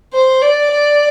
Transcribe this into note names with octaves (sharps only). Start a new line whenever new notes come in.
C5
D5
D5